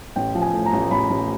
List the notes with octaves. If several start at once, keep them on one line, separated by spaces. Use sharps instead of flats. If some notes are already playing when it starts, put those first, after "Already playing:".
A1 G5
F3
G#5
A2
A#5
A1
A1 B5
A1